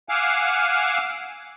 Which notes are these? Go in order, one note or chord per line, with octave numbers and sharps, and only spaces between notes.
F5 F#5 G#5 D6 E6 F6